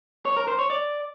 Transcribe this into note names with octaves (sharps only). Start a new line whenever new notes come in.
C#5
A#4
C5
C#5
D5